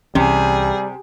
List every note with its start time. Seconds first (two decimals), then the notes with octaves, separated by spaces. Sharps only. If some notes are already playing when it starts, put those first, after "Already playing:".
0.15 C2 C3 E3 G3 C#4 G#4